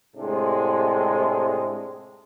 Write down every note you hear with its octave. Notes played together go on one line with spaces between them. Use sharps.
A2 C3 G#3 D4